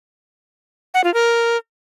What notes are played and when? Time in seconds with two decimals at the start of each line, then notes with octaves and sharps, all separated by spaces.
0.94 F#5
1.04 F4
1.14 A#4